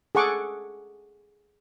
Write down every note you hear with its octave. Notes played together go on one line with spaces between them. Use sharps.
G#4 A4 F#5 C#6 D6